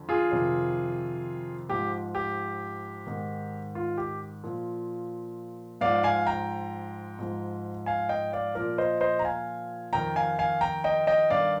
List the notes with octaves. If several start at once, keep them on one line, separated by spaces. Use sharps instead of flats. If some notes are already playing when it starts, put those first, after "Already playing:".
Already playing: F2 D3 F3
F4 G#4
F2 C3 D#3
G#2 F3 G4
G4
G#2 D#3
F4
G4
A#2 F3
G#2 F3 D5 F5
F5 G#5
G5 A#5
G#2 F3
F5 G#5
D#5 G5
D5 F5
A#2 F3 A#4 D5
C5 D#5
C5 D#5
A#5
F5 G#5
F2 D#3 G5 A#5
F5 G#5
F5 G#5
G5 A#5
D#5 G5
D#5 G5
G2 D#3 D5 F5